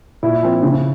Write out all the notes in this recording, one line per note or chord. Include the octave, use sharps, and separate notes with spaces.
A#2 E4
F3 C4
C#3